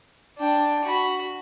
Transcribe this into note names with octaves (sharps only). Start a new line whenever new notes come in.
D4 G5
F#4 B5